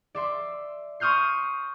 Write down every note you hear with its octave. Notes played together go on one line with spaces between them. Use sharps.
D5 E5 C6
C6 C#6 D#6 F6 G6 C7